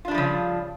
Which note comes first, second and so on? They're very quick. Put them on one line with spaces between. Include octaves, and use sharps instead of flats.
F4 D4 G3 F3 C#3